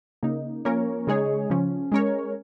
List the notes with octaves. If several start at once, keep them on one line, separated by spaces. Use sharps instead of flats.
C#3 A#3 D#4
F3 A#3 C#4 A#4 C#5
C#3 G#3 D#4 G#4 C#5
C#3 F3 C#4
G#3 C#4 A#4 C#5